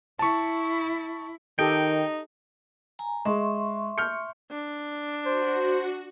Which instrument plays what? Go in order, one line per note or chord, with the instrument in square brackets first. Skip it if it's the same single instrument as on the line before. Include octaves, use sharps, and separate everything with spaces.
[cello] E4 [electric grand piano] A5 C#6
[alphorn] D#3 [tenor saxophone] D#4 [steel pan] G4 A4 D#5 [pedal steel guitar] G5
[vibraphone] G#5 A#5
[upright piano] G#3 [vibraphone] E5 C6 C#6
[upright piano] F6 G6 C#7
[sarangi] D4
[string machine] F#4 [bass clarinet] C5